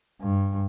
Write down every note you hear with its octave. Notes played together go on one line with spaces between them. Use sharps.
G2